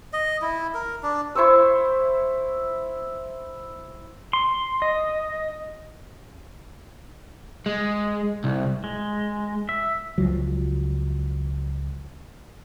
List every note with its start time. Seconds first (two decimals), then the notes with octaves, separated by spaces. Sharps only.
0.13 D#5
0.42 E4
0.74 A#4
1.03 D4
1.35 E4 C5 C#6 E6
4.33 C6
4.82 D#5
7.66 G#3
8.44 C2
8.84 G#3
9.69 E5
10.18 C#2 F3 F#3